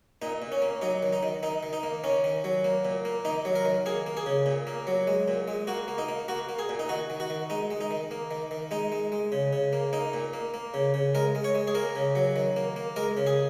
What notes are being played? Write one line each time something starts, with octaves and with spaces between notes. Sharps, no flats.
A#2 D#4
A#2
C#4
A#3
F#3 D#4
D#3
D#4
D#3
D#3 D#4
D#3
D#4
A#3
D#3 C#4
D#3
F#3
A#3
A#2
A#3
D#3 D#4
F#3
A#4
D#3
A#3 G#4
A#3
G#4
C#3
A#2
A#3
F#3
G#3
A#2
G#3
A#3 F#4
A#3
D#4
A#3
A#3 F#4
A#3
G#4
A#2
D#4
D#3 F#4
D#3
F#4
D#3
G#3 D#4
G#3
D#4
D#3
A#3
D#3
D#3
G#3 D#4
G#3
G#3
C#3
C#3
A#3
A#3 D#4
A#2
A#3
A#3
C#3
C#3
G#3 A#4
G#3
C#5
G#3
G#4
A#3 A#4
C#3
F#3
D#3
A#3
A#3
G#3 A#4
C#3
G#4